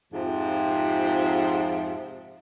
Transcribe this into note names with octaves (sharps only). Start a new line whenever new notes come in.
F2 G#2 C3 F3